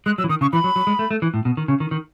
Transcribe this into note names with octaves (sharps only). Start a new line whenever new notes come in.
G#3 F#6
F#3 E6
E3
D#3 D#6
C#3 C#6
E3 B5
F#3
F#3
G#3
A3
A3
E3
A2
B2
D#3
C#3
D#3
D#3